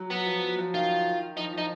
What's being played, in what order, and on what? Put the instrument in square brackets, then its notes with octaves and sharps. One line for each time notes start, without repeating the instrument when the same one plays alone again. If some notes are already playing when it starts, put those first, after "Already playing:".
Already playing: [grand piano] F#3
[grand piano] F#3 [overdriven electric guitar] B3
[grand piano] F3
F#3
F3
[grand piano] D#3 [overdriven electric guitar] F4
[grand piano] F3 [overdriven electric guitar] D#4
[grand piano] F3 [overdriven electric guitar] D#4